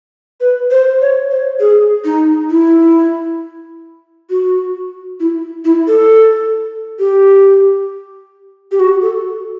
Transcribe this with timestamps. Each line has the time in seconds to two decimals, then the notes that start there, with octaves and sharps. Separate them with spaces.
0.40 B4
0.71 C5
1.01 C#5
1.31 C5
1.60 G#4
2.05 D#4
2.50 E4
4.30 F#4
5.20 E4
5.65 E4
5.87 A4
6.99 G4
8.72 G4
8.79 F#4
9.02 A4